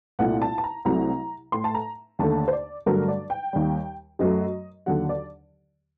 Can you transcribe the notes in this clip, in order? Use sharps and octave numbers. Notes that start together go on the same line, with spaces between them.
C2 A#2 A3 F#5
A5
A5
A#5
C2 C3 F#3 A3 A#5
A2 A3 C6
A5
A#5
D#2 D3 A3 A5
C5
D5
G2 D3 F#3 A3 A#4
D5
G5
D#2 D#3 G3
F#2 F#3 A3 D#5
D#2 D3 F#3 F#5
D5